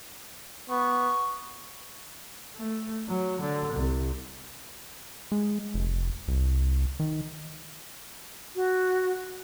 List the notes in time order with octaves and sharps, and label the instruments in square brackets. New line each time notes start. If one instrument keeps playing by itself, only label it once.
[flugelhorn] B3 [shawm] C#6
[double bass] A3
F#3
D3
C2
[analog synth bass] G#3
F1
C2
D#3
[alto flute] F#4